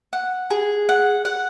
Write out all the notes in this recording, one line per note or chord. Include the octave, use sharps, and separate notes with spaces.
F#5
G#4
F#5
F#5